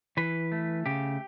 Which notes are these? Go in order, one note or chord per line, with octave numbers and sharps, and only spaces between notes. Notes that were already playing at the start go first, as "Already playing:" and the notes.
E3 B4
A3
C#3 G4